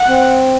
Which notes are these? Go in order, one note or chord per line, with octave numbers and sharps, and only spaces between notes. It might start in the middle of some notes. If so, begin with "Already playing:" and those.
Already playing: F#5
C4